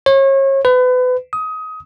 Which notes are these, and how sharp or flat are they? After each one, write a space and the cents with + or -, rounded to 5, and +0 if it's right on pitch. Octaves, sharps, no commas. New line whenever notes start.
C#5 -35
B4 +30
D#6 +20